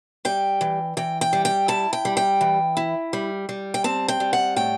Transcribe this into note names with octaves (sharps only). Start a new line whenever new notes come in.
G3 G5
E3
E3 G5
G5
G3
G5
E4 A5
G5
G3
G5
E3
E4
G3
G3
G5
C4 A5
G5
G3
F#5
A2 G5